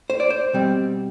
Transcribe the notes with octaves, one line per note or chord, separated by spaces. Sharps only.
C5
D5
C5
B2 G3 C4